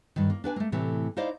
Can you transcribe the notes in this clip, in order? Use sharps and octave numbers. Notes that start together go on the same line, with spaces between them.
G2 D#3
A#3
D4 B4 G5 G#5
A3 A#3
A2 C3 E3 A3
D#4 E4 C5 D5 D#5 F5